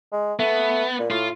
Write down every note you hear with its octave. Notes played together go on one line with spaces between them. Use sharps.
G#3
A3 B3
A#2
A2 F4